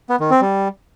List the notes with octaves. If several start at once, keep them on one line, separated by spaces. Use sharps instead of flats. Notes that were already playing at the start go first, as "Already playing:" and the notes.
B3
D#3
C4
G3